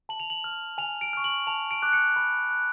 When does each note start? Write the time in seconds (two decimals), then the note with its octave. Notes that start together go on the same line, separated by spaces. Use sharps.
0.09 A5 F#7
0.20 F7
0.30 F#7
0.44 F6
0.78 G#5 F7
1.01 D7
1.13 C#6 F6
1.24 F#7
1.47 A5 F7
1.71 D7
1.82 D6 F#6
1.93 C#7
2.16 B5
2.51 F#6